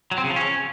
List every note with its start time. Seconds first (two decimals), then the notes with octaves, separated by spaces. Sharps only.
0.11 F#3
0.18 C4
0.24 C#3
0.30 F3
0.36 C#4